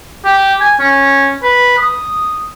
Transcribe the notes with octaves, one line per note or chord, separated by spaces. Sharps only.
G4
G#5
C#4
B4
D#6